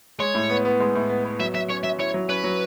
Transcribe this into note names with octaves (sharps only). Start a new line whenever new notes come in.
G#3 C#5
A2
B3
B3
G#3
A2
B3
B3
F#3 E5
F#3 E5
C#4 C#5
F#3 E5
E4 C#5
F#3
C#4 B4
F#3